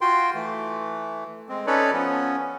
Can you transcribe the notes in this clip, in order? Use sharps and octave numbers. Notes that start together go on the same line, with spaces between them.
F4 F#4 G5 C6
E3 A3
G#3 C4
C#4 D#4 A4 B4 C#5 D5
F3 B3 C#4